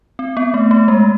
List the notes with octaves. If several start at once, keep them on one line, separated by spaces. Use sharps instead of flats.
C4
B3
A3
A3
G#3